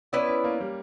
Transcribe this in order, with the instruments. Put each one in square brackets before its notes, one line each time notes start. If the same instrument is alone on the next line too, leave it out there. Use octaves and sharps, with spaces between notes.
[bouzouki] B3 E4 B4 D5 [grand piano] C#4
[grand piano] C#4
A#3
G3